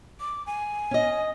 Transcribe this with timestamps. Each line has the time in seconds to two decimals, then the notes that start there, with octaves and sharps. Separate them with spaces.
0.20 D6
0.47 G#5
0.91 C#4 D#5